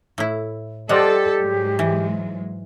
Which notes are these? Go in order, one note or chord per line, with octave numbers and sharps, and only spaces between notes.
A2 E4
G3 G4 A4 C5 D5 D#5 F#5
G#2 F#3 G#3
E3